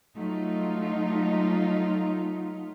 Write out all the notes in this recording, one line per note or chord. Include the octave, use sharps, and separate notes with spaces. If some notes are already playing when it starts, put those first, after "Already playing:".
F#3 A3 D#4 F4